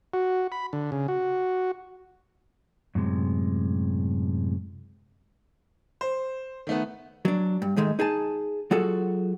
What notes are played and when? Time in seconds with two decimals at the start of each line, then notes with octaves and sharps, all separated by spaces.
0.14 F#4
0.52 B5
0.73 D3
0.92 C#3
1.08 F#4
2.95 F#2 A2 C3 G#3
6.01 C5
6.67 D#3 A3 B3
7.25 F#3 D4
7.62 G2
7.76 G#2 D#3 G#3 A3
7.99 D#4 G#4 G#5 A5
8.71 F#3 F4 F#4 G#4 A4